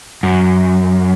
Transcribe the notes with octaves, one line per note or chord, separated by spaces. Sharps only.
F#2